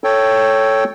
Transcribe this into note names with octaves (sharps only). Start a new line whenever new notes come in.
A4 C#5 G5